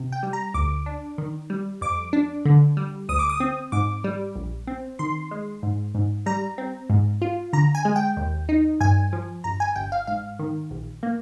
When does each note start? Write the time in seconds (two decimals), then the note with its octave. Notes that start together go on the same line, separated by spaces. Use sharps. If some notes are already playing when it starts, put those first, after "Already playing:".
Already playing: C3
0.12 G5
0.23 G3
0.33 A#5
0.54 D2 D6
0.86 D4
1.18 D#3
1.50 G3
1.81 F2 D6
2.13 D4
2.45 D3
2.77 G3
3.09 D2 D#6
3.19 D6
3.29 D#6
3.40 C4
3.72 G#2 D6
4.04 G3
4.36 A#1
4.67 C4
4.99 D#3 C6
5.31 G#3
5.63 G#2
5.95 G#2
6.26 G3 A#5
6.58 C4
6.90 G#2
7.22 F4
7.53 D3 A#5
7.75 G#5
7.85 G#3
7.96 G5
8.17 D#2
8.49 D#4
8.81 G2 G#5
9.13 F3
9.44 G1 A#5
9.60 G#5
9.76 G1 G5
9.92 F5
10.07 G#2 F5
10.39 D#3
10.71 A#1
11.03 A#3